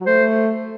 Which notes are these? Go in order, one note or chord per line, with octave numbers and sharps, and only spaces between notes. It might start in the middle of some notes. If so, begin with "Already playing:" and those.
F#3
A3 C5